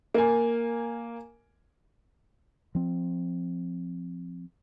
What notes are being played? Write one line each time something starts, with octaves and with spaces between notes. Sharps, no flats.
A#3 A#4 G#5
F3 C4